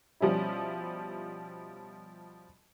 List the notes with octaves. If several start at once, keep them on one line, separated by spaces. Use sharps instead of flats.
B2 F3 G3 C#4 E4